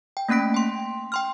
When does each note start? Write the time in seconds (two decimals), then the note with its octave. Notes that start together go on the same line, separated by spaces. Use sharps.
0.17 G5
0.29 A3 A#3 C#4 F#6 B6 D7
0.54 G5 C6
1.12 G5 C6 F6